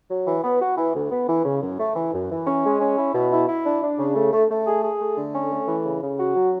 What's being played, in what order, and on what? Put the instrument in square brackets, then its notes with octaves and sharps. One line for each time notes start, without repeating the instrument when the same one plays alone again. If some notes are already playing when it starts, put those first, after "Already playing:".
[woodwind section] F#3
E3
B3
F#4
E3
D2
B3
E3
C#3
F#2
A3
E3
F#2
E3
C#4
G#3
C#4
E4
B2
E4
E4
D4
D4
C#3
A3
A3
A3
G#4
G#4
A3
D3
C#4
A3
E3
C#3
C#3
F#4
F#3